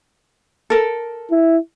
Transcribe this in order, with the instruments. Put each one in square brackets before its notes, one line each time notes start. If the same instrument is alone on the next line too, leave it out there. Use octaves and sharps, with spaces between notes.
[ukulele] A4 A#4
[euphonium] E4